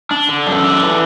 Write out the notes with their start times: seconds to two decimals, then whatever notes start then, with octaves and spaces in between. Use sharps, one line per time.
0.11 D4
0.29 D3
0.47 F#2 A4
0.64 D4
0.82 E3